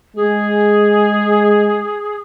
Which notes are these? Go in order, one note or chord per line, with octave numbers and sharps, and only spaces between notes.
G#3 G#4